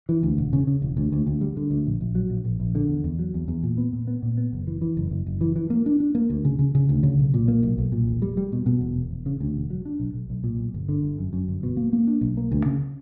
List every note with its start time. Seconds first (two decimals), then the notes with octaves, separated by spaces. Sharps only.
0.09 E3
0.23 D2
0.38 E1
0.53 C#3
0.67 C#3
0.82 E1
0.97 D2
1.12 D2
1.27 D2
1.41 G3
1.57 D3
1.71 D2
1.86 A#1
2.01 A#1
2.15 F#3
2.30 A#1
2.45 A#1
2.60 A#1
2.75 D3
2.89 E2
3.04 E2
3.19 F#3
3.34 E2
3.48 E2
3.63 A#2
3.78 B3
3.93 A#2
4.07 B3
4.23 A#2
4.37 B3
4.53 F#1
4.67 E3
4.81 E3
4.97 F#1
5.11 F#1
5.26 F#1
5.41 E3
5.56 E3
5.70 A#3
5.86 D4
6.00 D4
6.15 A#3
6.30 D2
6.45 C#3
6.59 C#3
6.75 C#3
6.89 D2
7.03 C#3
7.19 B1
7.34 A#2
7.48 A#3
7.63 B1
7.78 B1
7.92 A#2
8.08 E1
8.22 G3
8.37 G3
8.52 B2
8.66 B2
8.81 E1
8.96 E1
9.11 E1
9.26 C#3
9.40 D2
9.56 E1
9.70 F#3
9.85 D4
10.00 B1
10.14 B1
10.30 B1
10.44 A#2
10.59 B1
10.74 G1
10.89 D3
11.03 G1
11.18 F#2
11.33 F#2
11.48 G1
11.63 B2
11.77 A#3
11.93 A#3
12.07 D4
12.21 B1
12.37 A#3
12.52 D2
12.66 C#3